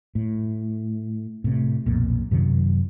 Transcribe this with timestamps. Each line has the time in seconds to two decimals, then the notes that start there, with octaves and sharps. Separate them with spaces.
0.15 A2
1.44 A2 C3
1.86 B1 F2 A#2
2.31 F#2 C3 D#3 F#3